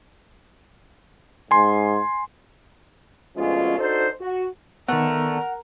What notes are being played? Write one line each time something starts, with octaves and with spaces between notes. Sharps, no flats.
G#2 G#5 C6
D2 B2 F3 G#3 C#4 F4
D4 D#4 F#4 A4 C5
F#4
D3 D#3 A3 B3 A#4 F#5